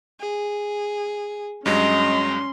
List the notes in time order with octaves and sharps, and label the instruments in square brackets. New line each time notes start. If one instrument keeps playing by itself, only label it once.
[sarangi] G#4
[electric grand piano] G2 F#3 G#3 [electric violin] C#4 C6 [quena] D#5 [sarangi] A#5